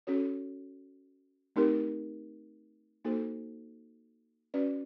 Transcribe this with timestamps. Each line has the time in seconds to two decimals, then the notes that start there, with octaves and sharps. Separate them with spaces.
0.07 C#4 F#4 A4 C#5
1.56 A3 C4 D#4 G4 A#4
3.05 A#3 D#4 F#4 A4 C5
4.54 C#4 F#4 B4 D5